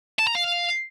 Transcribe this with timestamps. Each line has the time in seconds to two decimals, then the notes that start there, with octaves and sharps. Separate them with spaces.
0.19 A5
0.27 A#5
0.35 F5